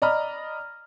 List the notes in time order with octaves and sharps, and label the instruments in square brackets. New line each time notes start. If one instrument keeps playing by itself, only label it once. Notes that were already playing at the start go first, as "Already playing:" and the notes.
[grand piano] D5 D#5 A#5 B5 F6